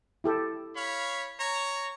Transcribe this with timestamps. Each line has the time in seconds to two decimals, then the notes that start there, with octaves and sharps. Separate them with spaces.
0.24 E4 G4 A4
0.75 C#5 F5 B5
1.39 C#5 A#5